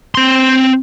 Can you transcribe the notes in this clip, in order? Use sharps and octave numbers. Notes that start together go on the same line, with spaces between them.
C4 C6